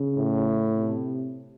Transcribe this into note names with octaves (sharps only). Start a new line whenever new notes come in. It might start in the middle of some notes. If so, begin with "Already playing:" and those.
Already playing: C#3
A2
C3